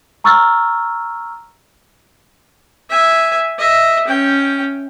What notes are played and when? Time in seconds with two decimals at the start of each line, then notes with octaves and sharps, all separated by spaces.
0.24 A#5 C#6 E6 F6 A6
2.89 E5 G#5
3.58 D#5 E5
4.07 C#4 G5